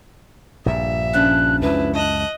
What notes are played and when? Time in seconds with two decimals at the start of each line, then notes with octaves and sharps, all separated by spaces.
0.66 A#1 G2 A#2 E5
1.13 C#3 F3 D4 F#6
1.62 C#2 F#2 E4 B4
1.94 D#5 A5 F#6